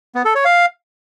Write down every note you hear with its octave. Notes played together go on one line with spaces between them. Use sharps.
B3
A4
C#5
F5